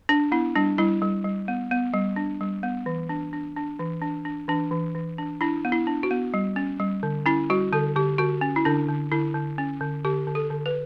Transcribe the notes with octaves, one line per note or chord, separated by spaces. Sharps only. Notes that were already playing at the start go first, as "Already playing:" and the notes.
D4
B3 E4
G3 D4
G3 E4
G3
G3
B3
B3
G3
D4
G3
B3
E3
D4
D4
D4
E3
D4
D4
E3 D4
E3
E3
D4
D4 E4
B3
E4
D4
F#4
B3
G3
C#4
G3
D3
C#4 E4
G3 F#4
D3 A4
D3 G4
D3 F#4
C#4
E4
D3 D4
D3
D3 E4
D3
C#4
D3
D3 G4
D3
A4
D3
B4